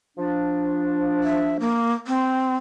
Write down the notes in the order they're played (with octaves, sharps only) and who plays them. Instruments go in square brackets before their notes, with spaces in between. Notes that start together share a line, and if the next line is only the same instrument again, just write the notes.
[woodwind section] F3 D4
[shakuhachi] E5
A#3
C4